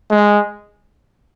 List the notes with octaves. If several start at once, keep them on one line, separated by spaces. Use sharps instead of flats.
G#3